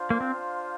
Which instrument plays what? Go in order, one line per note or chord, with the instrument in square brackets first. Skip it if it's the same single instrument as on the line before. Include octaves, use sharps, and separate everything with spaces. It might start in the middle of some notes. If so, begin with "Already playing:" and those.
Already playing: [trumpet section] D4 F4 C5 F5
[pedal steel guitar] A#3
C4